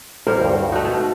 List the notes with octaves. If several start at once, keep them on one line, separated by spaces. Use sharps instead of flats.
A1 G3 C4 A#4 C5 C#5
D2 G2
A3 D#4 F#4
B2